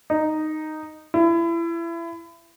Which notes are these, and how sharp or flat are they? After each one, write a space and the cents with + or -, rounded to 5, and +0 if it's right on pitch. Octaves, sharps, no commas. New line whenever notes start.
D#4 -5
E4 +30